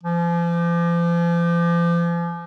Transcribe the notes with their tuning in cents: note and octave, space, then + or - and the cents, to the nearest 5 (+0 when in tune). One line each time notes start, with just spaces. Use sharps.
F3 -40